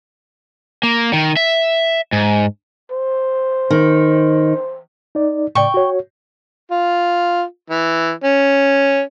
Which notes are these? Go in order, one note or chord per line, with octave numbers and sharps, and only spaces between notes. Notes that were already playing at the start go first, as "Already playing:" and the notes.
A#3
D#3
E5
G#2
C5
D#3
D#4 D5
A2 C#3 D5 G5 C#6
F#4 C#5
F4
E3
C#4